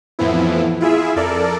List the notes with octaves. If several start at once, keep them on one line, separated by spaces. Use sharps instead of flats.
F2 A2 E3 F3 B3 E4
E4 F4 G#4 E5
F2 A4 A#4 D5